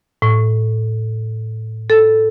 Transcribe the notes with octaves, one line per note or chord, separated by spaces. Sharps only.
A2
A4